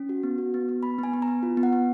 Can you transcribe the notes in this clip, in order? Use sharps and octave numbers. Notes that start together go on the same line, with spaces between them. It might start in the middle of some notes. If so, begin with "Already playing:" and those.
Already playing: C#4
F#4
B3
F#4
B3
B3
B3 B5
B3 G#5
B3
A#5
B3
F4
B3
F#5
B3